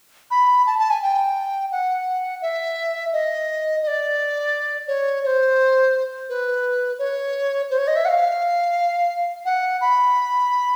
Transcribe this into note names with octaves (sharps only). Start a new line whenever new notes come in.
B5
A5
A5
G#5
G5
F#5
E5
D#5
D#5
D5
C#5
C#5
C5
B4
C#5
C5
C#5
D#5
E5
F#5
F5
F#5
B5